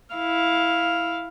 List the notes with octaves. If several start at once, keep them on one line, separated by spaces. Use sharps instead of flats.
E4 F5